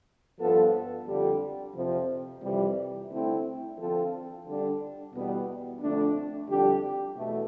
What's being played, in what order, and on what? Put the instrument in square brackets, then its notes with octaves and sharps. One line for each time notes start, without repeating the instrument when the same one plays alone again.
[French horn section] G2 F3 B3 F4 A4
F2 D3 G3
F2 C3 F3
F2 C3 E3 G3
D3 A3 C4 E4
D3 F3 C4 F4 A4
D3 G3 D4
E2 B2 G3 B3
F2 D3 A3 D4
F2 D3 G3 D4 G4
E2 B2 A3